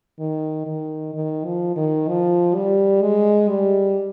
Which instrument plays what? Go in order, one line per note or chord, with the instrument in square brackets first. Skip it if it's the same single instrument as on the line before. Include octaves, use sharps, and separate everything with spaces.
[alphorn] D#3
D#3
D#3
F3
D#3
F3
G3
G#3
G3